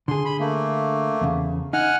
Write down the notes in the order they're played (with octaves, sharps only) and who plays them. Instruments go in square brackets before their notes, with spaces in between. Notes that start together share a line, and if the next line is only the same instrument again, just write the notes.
[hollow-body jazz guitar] D3 G#4 [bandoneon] C6
[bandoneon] B5
A3 A#3
[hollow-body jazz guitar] E2 C#3
[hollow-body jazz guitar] D#4 [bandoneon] F#5 G#5 F6